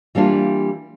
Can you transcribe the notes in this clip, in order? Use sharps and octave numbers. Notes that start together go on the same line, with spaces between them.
E3 G3 A#3 D4 F4